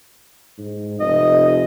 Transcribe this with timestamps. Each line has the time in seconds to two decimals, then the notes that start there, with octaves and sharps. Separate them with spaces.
0.58 G#2
1.00 F1 D#5